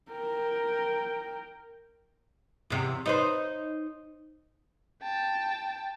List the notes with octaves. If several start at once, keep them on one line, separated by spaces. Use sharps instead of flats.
A#4 G5
E2 C3
D#4 B4 C5
G5 A5